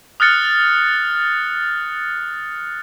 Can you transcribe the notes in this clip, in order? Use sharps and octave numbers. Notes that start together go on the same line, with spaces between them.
D#6 F6 F#6 A6 C#7